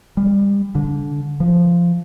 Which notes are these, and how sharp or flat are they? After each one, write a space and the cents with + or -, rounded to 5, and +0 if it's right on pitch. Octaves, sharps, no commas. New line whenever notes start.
G3 +35
D3 -20
F3 -10